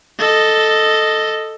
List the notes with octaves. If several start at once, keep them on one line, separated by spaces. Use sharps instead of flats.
A4 D#5